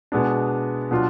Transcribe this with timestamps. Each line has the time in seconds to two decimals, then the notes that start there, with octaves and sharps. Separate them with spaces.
0.12 B2 G#3 B3 D4
0.91 B2 F#3 D4 F4